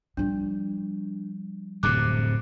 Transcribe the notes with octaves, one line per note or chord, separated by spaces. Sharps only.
F3 G3 D4
D1 F2 C3 D6 F#6